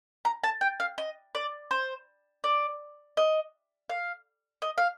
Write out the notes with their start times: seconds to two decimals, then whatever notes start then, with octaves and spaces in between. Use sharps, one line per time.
0.25 A#5
0.44 A5
0.61 G5
0.80 F5
0.98 D#5
1.35 D5
1.71 C5
2.44 D5
3.17 D#5
3.89 F5
4.62 D#5
4.78 F5